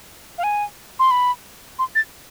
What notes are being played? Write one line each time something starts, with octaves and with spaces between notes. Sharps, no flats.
F5
G#5
C6
B5
C6
A6